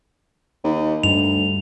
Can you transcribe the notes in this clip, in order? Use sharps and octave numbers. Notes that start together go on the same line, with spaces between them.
D#2
D2 G2 F7